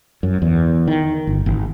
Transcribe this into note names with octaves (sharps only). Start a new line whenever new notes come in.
F#2
E2
D#3
G1
G#1